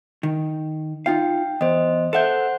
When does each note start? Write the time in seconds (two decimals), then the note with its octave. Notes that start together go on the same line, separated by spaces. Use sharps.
0.23 D#3
1.06 D#4 F4 F5 G5
1.61 E2 C5 D#5
2.13 A4 C5 E5 F#5 G6